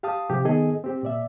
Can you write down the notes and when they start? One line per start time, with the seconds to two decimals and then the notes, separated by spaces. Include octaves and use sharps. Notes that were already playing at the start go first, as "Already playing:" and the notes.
0.03 G4 F5 A5 D#6
0.29 C3 F3 G4
0.45 D#3 B3 G#4 A4 D#5 G#5
0.84 C4 G4
1.03 A#2 D5 E5